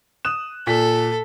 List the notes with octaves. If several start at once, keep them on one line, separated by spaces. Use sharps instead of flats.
D#6 F#6 E7
A#2 A4 B6